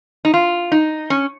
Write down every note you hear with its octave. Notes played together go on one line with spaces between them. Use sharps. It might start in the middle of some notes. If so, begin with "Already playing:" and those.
D#4
F4
D#4
C#4